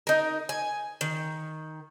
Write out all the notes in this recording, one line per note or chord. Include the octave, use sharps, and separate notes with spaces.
D#4 A#4
G#5
D#3